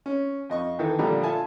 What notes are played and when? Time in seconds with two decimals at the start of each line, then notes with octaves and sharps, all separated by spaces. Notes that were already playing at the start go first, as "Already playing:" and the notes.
0.06 C#4
0.50 F2 D#5 C#6
0.79 D#3 E3 A4
0.99 A#1 A#2 D3 G3 A3 A#5
1.23 F4 A4 E5 G#5 A5